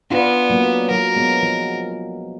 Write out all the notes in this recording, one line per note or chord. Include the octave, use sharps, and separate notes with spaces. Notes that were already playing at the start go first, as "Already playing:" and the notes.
B3 D4 F4
F#3 A#3
F#3 A#4
G#3 B3
F3